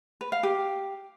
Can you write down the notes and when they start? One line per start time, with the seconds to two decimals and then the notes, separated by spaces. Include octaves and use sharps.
0.21 B4
0.32 F5
0.43 G4